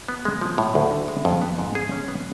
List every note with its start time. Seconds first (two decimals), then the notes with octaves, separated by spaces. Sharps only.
0.08 B3
0.25 G#3
0.41 F3
0.58 A2
0.75 D2
0.91 D3
1.08 G#3
1.25 F2
1.42 B3
1.58 G#2
1.75 G#4
1.92 C#4
2.08 B3